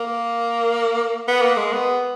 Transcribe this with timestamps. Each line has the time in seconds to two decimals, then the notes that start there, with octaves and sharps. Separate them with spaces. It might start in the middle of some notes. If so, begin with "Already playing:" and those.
Already playing: A#3
1.28 B3
1.42 A#3
1.57 G#3
1.72 B3